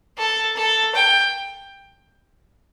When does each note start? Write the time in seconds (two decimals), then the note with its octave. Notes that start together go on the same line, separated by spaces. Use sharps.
0.18 A4
0.57 A4
0.95 G5